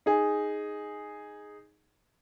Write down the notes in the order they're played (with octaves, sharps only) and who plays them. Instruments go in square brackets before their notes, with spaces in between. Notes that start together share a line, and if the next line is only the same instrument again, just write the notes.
[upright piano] D#4 G#4